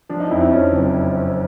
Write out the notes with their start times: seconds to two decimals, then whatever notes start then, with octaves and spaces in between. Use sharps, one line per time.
0.09 F3 D4
0.20 D#4
0.30 F2 E4
0.41 D#4
0.51 F2 C#4
0.72 F#1